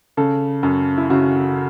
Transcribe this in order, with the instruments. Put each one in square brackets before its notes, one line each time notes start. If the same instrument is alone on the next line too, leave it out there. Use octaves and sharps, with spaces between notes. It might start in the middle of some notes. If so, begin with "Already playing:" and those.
[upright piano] C#3 A4
F#2
E4
C#3 F#4